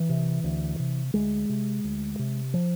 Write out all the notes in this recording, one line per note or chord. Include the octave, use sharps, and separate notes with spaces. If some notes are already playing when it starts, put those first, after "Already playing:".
Already playing: E3
C3
D2
C3
D2 G#3
C3
D2
C3
F3